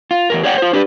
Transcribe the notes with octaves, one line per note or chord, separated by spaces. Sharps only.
F4
E2 G#2 A#4
G#4 C#5 D5 F#5 G5
F4 C5
D4 G4 B4 C#5 D5